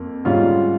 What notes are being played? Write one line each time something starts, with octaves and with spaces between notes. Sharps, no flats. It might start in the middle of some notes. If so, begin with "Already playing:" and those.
Already playing: F2 A#3
G#2 G3 C#4 F4